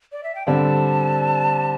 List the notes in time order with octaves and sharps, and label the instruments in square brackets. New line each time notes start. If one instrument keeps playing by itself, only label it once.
[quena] D5
E5
G5
[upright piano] D3 G3 C4 [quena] A5